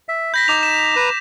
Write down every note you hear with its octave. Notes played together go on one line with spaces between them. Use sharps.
E5
B5 G6 A#6 B6
D#4 D6 F7
E7
B4 A#5